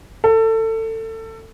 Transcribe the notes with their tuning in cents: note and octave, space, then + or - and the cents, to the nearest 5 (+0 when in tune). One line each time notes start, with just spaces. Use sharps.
A4 +25